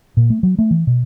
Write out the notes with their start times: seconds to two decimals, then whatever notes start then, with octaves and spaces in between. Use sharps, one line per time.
0.17 A#2
0.30 A3
0.43 F#3
0.59 A3
0.71 E3
0.87 B2